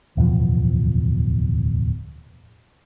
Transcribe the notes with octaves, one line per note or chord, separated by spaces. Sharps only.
D1 E2 B2 F3